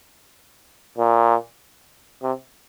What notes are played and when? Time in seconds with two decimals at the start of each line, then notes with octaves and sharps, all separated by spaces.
0.98 A#2
2.23 C3